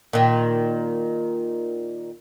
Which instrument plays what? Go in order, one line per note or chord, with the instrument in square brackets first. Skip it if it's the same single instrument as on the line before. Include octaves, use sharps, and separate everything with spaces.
[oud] A#2 D#3